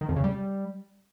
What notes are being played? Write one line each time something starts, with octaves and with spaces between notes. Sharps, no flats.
D#3
F2
C#3
G3